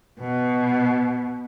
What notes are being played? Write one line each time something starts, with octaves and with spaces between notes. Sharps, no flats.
B2